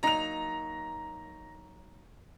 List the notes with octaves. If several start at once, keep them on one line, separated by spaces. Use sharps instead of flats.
F#3 A#3 D#4 A#5 F7